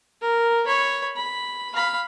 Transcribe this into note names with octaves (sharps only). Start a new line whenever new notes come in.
A#4
C#5 B5
B5
F5 B5